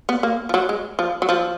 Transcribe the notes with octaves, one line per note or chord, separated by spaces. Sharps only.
B3
A#3
F3
F#3
G#3
F3
F#3
F3